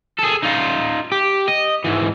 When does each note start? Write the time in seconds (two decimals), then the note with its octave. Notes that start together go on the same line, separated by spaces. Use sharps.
0.19 G#4 A4
0.43 D#4 F4
1.12 G4
1.48 D#5
1.84 G#2 E3